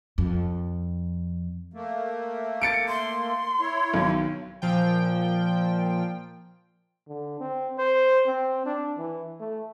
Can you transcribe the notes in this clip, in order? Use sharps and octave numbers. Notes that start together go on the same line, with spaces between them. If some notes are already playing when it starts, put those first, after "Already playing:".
F2
A3 A#3
A6 C#7 D7
C6
E4 C#5
B1 D#3
A#2 F3 G5
D3
C4
C5
C4
D4
E3
A3